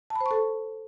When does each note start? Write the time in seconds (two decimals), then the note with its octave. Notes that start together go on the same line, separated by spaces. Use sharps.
0.10 A5
0.15 B5
0.21 C5
0.26 C#6
0.31 A4